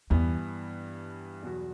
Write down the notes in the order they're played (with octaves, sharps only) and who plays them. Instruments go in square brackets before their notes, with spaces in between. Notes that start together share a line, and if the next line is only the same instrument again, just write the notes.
[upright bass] E2 [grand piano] G2 E3 B3
[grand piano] E2 B2 F#3 B3 F#4